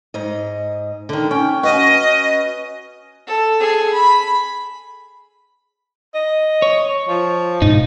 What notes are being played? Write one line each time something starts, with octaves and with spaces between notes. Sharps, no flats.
G#2 D#5
D3 D#3
C#4 G5
C#4 F#4 B4 D#5
A4
G#4 A4
B5
D#5
C#5
F3
G#2 B2 D#4